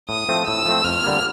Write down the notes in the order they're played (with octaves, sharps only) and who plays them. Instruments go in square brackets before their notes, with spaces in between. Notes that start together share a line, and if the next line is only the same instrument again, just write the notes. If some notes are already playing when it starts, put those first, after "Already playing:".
[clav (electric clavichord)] A2 [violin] D#6
[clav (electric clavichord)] F3 A3 C4
[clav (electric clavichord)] A2 [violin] E6
[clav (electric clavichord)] F3 A3 C4
[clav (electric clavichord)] F2 [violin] F6
[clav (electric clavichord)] D3 G3 A#3